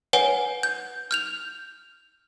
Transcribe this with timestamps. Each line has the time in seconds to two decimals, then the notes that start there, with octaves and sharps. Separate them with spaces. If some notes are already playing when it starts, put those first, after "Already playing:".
0.13 B4 C#5 F#5 G#5
0.63 G6
1.11 F6 G6 F7